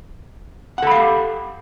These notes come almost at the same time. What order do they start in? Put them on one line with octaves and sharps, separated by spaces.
F#5 A4 B5 F5 G4